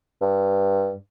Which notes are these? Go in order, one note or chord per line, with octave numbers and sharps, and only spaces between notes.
G2